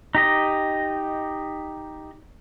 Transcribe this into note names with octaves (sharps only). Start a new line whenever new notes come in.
D#4 G4 D#5